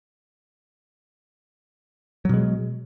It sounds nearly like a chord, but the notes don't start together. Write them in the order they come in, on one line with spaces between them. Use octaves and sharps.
F#3 B2 G#3